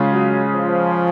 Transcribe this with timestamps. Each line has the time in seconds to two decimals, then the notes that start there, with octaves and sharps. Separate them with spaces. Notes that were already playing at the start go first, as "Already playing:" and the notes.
Already playing: C#3 G#3 C#4 F4 G#4
0.12 F#3
0.53 F3